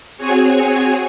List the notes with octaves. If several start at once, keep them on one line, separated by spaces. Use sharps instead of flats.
C4 F#4 G#4 C#5 G#5